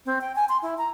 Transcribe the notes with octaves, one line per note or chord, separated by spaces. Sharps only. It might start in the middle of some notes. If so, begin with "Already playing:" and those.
C4
G5
G#5
C6
E4
A#5